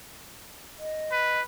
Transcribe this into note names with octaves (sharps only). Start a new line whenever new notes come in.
D#5
B4